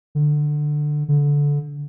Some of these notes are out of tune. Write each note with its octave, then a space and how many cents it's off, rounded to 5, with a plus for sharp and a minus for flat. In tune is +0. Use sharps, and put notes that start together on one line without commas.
D3 +15
D3 -20